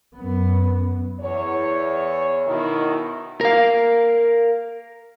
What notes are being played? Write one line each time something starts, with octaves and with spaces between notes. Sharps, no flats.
F#2 B3
E2 C#5
B2 D#3 E4
A#4 F5